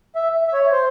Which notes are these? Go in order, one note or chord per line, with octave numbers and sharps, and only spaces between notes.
E5
E5
C#5
C5